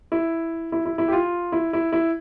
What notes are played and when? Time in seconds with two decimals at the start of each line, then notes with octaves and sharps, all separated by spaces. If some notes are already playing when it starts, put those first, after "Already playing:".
0.12 E4
0.72 E4
0.86 E4
0.98 E4
1.08 G4
1.12 F4
1.52 E4
1.73 E4
1.93 E4